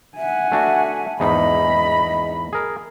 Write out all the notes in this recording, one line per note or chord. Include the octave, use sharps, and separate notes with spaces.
E5 F#5 G#5
A3 D4 F#4 E5
E2 G#2 D#4 D#5 B5
G#4 A#4